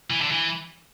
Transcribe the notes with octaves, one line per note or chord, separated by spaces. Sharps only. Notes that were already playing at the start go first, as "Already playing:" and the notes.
E3
D3
E3